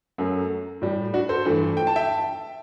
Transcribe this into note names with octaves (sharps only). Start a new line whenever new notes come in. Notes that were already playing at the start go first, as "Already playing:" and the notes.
F#2 F#3 A3
A2 G3
D4 F#4
A4 C5
G2 E3 A3
G5
A5
E5 G5